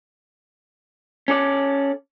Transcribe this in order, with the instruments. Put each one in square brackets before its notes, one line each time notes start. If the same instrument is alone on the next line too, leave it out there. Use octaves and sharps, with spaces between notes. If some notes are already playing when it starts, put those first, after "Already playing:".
[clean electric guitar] C#4 A4 D5